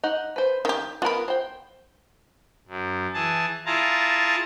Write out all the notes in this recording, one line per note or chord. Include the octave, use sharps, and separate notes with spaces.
D#4 F#5
B4 C5
D#3 G4 G5
B3 F4 A#4 B5
C5 G5
F#2
E3 G#4 A5
E4 F4 G#4 A5 A#5